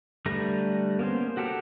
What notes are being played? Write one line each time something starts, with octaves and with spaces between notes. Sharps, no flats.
D3 G3 A3 B4 A#5
A#3 B3 C#4 C5
F#4 G4 A4 A#4